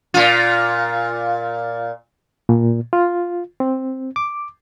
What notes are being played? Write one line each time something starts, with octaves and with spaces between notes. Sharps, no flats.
A#2 F4
A#2
F4
C4
D6